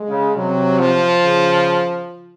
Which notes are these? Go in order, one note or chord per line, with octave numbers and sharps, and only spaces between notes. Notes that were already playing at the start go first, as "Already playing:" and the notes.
Already playing: G#3
C#3
C3 F#3
F3
C#3